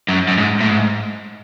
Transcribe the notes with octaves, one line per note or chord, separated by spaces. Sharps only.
F#2
F#2
G#2
A2
G#2